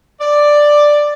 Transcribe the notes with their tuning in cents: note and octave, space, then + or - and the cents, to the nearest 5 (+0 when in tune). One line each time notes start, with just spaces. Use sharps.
D5 +5